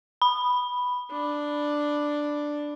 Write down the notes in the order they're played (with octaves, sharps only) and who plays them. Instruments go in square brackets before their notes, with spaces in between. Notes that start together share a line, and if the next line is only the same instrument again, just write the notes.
[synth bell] B5
[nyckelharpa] D4